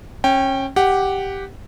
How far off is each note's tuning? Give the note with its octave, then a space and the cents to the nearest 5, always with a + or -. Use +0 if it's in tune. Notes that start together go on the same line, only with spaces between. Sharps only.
C#4 -25 G5 +0
G4 +0 F#5 +10